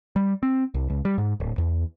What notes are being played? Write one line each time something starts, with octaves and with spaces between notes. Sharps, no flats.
G3
C4
C2
C#2
G3
G#2
D1
E2